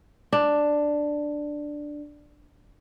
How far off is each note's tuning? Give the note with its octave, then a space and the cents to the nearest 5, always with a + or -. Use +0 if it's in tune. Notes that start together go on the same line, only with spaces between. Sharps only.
D4 +5